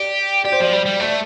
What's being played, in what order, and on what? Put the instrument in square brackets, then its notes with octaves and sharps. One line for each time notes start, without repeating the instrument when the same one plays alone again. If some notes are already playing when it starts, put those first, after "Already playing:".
Already playing: [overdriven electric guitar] G4 [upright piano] D5
[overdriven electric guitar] G4 [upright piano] D5
[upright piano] C5
[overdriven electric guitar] F3 [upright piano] D5
[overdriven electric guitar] G3
G3
[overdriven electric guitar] A3 [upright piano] D5